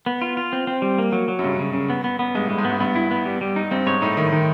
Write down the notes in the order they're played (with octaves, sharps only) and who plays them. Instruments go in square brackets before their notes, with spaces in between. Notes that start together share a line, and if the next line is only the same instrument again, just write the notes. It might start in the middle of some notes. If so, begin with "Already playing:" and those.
[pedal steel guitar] B3
F4
F4
C4
C4
G3
A#3
F#3
F#3
[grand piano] F#2
[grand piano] G2 [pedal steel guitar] C#3
[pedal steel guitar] C#3
C#3
B3
B3
B3
[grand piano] G2 [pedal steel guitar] G#3
[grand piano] A2 [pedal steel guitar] G#3
[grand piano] G#2
[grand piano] G2 [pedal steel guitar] B3
[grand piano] G2 [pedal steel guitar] B3
[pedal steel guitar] E4
B3
G3
G3
D#4
[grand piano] G2 [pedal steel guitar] C4
[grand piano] G#2 [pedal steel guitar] C#5
[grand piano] A2 [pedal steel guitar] D#4
[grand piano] A2 [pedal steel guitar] D#3
[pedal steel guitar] D#3